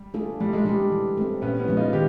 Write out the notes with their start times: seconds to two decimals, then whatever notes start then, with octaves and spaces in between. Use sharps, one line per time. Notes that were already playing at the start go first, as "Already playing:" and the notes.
Already playing: G3
0.14 A3 D4 F4 G#4
0.40 G3 A3
0.53 G#3
0.65 G3 D4 G4
0.92 E3
1.17 A3 C4
1.42 A#2 B3 C#4
1.59 B3 C#4
1.68 F3 G#3
1.77 D#4 F4
1.93 D#3 G4